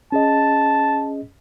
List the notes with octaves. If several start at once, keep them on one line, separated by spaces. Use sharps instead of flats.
C#4 G#4 D#5 A5